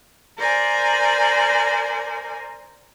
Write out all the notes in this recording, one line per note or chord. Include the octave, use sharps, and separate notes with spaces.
A#4 C5 D5 G#5